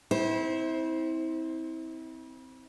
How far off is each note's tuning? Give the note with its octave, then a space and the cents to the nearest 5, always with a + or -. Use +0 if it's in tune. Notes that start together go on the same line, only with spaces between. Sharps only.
C4 -10 E4 -35 C5 +10